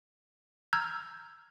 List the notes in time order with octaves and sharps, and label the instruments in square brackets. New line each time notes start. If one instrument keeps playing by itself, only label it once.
[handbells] A#5 E6 F6 G6 G#6